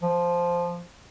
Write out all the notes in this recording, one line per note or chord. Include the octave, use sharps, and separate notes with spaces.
F3